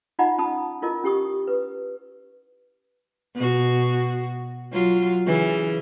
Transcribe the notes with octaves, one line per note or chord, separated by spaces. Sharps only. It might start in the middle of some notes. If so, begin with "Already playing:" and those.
D#4 F4 D#5 F#5 A#5 B5
C#4 A5 B5 D#6
E4 F4 A#4 D#5
C#4 G4 C#6 D#6
B4
B2 F#4
F#3 F4
C#3 E3